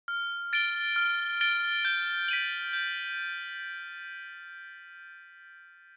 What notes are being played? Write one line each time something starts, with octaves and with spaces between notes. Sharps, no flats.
F6
A6 D7 G7
F6
A6 D7 G7
G6
B6 D#7 F#7
G6